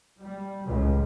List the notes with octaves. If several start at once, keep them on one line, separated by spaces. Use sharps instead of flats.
G3
C#2 A2